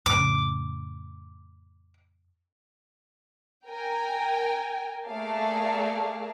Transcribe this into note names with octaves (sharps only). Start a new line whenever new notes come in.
F2 A2 C#3 D6
A#4 G5 G#5
A3 A#3 G#4 D5 F5 A5